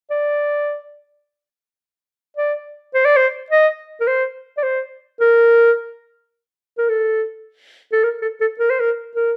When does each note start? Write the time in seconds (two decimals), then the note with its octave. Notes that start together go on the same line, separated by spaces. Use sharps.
0.11 D5
2.37 D5
2.94 C5
3.05 D5
3.16 C5
3.50 D#5
4.01 A#4
4.07 C5
4.57 D5
4.63 C5
5.20 A#4
6.78 A#4
6.89 A4
7.92 A4
8.03 A#4
8.22 A4
8.41 A4
8.59 A#4
8.70 C5
8.80 A#4
9.16 A#4